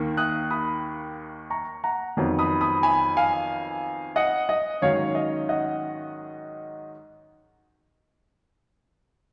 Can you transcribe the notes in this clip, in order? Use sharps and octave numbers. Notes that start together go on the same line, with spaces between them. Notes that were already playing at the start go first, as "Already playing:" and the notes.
Already playing: D#2 D#3 A#3
D#6 F#6
B5 D#6
A#5 C#6
F#5 A#5
F2 D#3 F#3 B3
B5 D#6
B5 D#6
G#5 B5
F5 G#5
D#5 F#5
D#5
G#2 D#3 F#3 C#4 C#5 F5
D#5
D#5 F#5